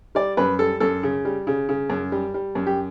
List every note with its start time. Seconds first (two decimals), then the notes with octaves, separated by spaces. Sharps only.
0.15 G3 D5
0.37 F#2 B4
0.59 G3 A4
0.80 F#2 A4
1.03 C#3
1.25 G3
1.47 C#3
1.69 C#3
1.90 F#2
2.12 G3
2.34 G3
2.55 F#2
2.67 G4